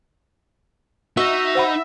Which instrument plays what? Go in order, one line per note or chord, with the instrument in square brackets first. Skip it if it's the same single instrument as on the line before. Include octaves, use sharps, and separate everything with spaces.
[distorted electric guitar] D#4 [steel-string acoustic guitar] F#4 [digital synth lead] E5
[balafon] C5 F#5 B5